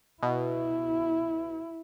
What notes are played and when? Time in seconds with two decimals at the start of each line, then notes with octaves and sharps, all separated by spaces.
0.23 B2 E4